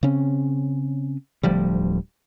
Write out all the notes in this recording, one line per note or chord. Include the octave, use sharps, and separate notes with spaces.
C#3 C4 C#4
D1 D2 F3 G3